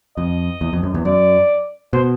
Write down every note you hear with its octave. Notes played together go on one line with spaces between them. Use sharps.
F2 D#5
E2
F2
F#2
E2
F#2 D5
B2 C5